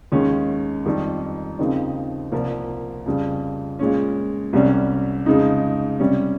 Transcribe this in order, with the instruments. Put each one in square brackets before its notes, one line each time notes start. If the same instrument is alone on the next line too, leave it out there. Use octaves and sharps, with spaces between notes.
[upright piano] D#2 D#3 G#3 C#4
F2 D#3 G3
D#2 C#3 F3 C4 D#4
C2 A#2 F3 A#3
F2 C#3 G3
A#2 G#3 C#4
C2 C3 G3 C#4
F2 C#3 G#3 D#4
C3 G3 C#4